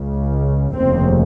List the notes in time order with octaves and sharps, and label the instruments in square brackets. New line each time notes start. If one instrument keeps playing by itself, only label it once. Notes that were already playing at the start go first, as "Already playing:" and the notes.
Already playing: [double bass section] C#2 C#3
F1 D#2 C#3 C4